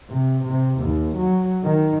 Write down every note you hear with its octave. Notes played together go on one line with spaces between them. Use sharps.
C3
C3
D#2
F#3
D#3